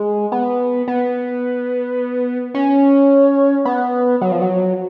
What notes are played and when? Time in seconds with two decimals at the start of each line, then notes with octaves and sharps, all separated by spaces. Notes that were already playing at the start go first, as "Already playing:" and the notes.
Already playing: G#3
0.32 B3
0.88 B3
2.55 C#4
3.65 B3
4.21 F#3
4.31 F3
4.42 F#3